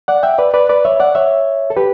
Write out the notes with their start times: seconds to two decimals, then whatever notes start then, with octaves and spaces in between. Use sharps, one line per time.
0.08 D5 F#5
0.23 E5 G5
0.38 B4 D5
0.54 B4 D5
0.69 B4 D5
0.85 C#5 E5
1.00 D5 F#5
1.15 C#5 E5
1.70 A4
1.77 G4 B4